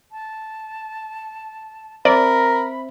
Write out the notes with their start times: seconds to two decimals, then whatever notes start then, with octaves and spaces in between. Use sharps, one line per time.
0.12 A5
2.05 C4 A#4 C5 D5 E5 B5